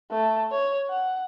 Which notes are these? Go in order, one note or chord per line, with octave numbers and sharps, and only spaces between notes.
A3
C#5
F#5